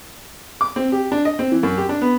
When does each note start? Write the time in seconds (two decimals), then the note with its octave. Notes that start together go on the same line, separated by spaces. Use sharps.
0.61 D6
0.76 C4
0.92 G4
1.12 D4
1.25 D#5
1.39 C4
1.52 E3
1.63 F#2
1.78 G4
1.89 D4
2.01 B3